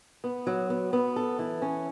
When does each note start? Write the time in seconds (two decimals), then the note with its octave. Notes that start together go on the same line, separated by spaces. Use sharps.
0.24 B3
0.47 F#3
0.70 B3
0.93 B3
1.16 A4
1.39 E3
1.62 C#4